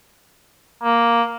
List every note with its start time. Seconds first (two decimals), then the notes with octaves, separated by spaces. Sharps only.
0.83 A#3